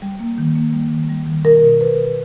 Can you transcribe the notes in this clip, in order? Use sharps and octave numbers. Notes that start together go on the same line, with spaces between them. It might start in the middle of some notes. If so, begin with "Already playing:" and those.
G3
A#3
D#3
A#3
G3
D#3
G3
D#3
B2 A#4
B2
B2 B4
B2